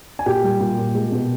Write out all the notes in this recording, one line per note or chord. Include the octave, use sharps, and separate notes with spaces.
G#5
A#2 G4 G5
G3
A#2
A#2
G#3
B2